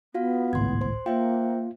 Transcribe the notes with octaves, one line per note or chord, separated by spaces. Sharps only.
B3 F4 F#4 F5
G#1 C#2 A2 C6 G#6
C5 C6
A#3 F4 C5 E5 G5